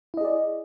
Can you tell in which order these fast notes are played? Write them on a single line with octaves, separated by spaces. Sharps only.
E4 D#5 G#4 D5